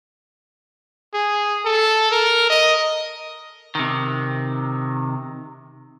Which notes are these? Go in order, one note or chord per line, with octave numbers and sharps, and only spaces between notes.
G#4
A4
A#4
D#5
C3 D#3